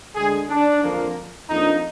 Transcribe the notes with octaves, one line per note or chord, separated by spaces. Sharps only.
D2 D3 G#3 G#4
D4
F2 D3 F3 A#3
F2 F3 A#3 D4 D#4